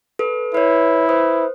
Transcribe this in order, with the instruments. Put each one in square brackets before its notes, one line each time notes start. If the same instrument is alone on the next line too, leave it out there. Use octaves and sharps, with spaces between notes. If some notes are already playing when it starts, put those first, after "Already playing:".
[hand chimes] A4 B4
[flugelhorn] E4 [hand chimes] B4 C#5
[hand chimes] B4 C5 D#6